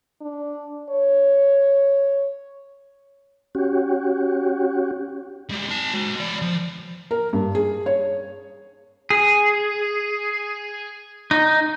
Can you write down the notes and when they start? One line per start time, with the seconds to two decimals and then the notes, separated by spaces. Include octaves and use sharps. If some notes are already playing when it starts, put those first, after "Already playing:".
0.21 D4
0.90 C#5
3.55 C#4 F#4 G4
5.50 G3 G#3
5.69 D#4 A5
5.94 G#3 F#4
6.16 G#3 D5
6.42 F3
7.11 A#4
7.33 G2
7.55 G#4
7.86 C#5
9.10 G#4
11.31 D#4